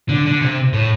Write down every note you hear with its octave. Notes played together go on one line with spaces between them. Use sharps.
D3
D3
C3
A2